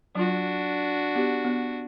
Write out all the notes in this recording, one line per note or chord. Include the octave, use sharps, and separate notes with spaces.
F#3 D4 F4 F#4
B3 G4
B3